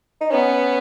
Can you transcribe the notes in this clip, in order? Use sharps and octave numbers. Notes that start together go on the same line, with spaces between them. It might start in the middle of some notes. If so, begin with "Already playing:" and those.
D#4
B3 C#4